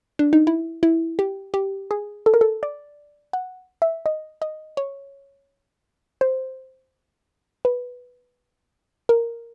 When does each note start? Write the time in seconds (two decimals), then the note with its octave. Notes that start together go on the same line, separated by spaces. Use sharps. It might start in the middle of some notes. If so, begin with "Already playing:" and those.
0.19 D4
0.33 D#4
0.47 E4
0.83 E4
1.19 G4
1.54 G4
1.91 G#4
2.26 A4
2.34 A#4
2.41 A4
2.63 D5
3.33 F#5
3.82 E5
4.06 D#5
4.42 D#5
4.77 C#5
6.21 C5
7.65 B4
9.09 A#4